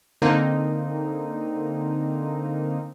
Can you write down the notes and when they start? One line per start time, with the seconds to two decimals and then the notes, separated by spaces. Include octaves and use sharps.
0.22 D3 A#3 C4 D#4